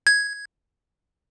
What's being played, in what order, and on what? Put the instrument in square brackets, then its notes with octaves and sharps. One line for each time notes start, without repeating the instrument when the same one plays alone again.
[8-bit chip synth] G#6